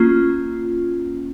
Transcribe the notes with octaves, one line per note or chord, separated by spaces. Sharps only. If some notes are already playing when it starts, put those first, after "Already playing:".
Already playing: A#3 C#4 F4